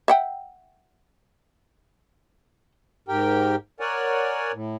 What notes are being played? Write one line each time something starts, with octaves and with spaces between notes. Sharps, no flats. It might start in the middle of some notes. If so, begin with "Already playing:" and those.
E5 F#5 G5
G#2 G4 A#4 G5
A#4 C#5 D5 F#5 G#5
A2